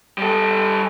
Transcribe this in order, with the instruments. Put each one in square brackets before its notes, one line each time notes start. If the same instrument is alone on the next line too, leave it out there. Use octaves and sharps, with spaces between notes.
[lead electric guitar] G3 A4